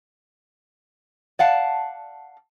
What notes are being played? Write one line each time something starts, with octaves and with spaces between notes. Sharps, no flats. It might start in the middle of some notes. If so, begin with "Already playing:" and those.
D5 F5 F#5 A5